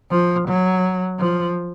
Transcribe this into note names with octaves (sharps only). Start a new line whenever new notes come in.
F3
F#3
F3